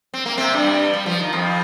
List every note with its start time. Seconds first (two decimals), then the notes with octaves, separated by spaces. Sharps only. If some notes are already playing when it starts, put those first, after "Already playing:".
0.14 C4
0.26 A#3
0.37 C3 C4
0.53 G2 G3
0.93 G3
1.06 F3
1.20 D#3
1.33 F2 F3